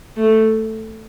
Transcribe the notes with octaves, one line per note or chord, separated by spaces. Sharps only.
A3